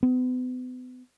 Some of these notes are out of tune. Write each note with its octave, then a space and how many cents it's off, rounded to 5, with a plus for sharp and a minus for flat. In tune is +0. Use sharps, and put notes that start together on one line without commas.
B3 +40